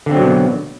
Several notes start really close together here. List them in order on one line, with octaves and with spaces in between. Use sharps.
D3 C4 F#3 B2